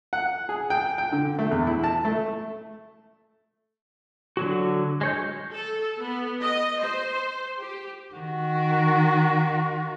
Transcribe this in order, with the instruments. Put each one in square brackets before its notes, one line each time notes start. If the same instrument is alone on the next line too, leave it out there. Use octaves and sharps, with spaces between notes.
[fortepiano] F#5
G#4
G5
G5
D3
A3
E2
E4
A5
A3
[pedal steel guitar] D3 F#3 F#4
G#3 C#5 G6
[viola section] A4
B3
D#5
C5
G4
[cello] D#3 F#4